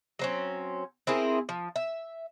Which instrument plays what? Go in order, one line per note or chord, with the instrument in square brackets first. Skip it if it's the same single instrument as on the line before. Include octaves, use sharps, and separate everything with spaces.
[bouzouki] F#3 C4 C#4
C4 E4 G#4 A#4
F3
E5